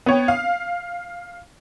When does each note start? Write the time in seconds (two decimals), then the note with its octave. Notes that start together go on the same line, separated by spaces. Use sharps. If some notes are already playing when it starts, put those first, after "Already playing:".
0.06 B3 C#5 G5
0.28 F5